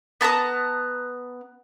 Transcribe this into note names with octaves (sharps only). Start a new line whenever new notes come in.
B3 A5 A#5 D#6